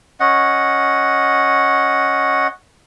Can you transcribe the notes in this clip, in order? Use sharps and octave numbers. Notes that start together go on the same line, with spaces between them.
C#4 D#5 F#5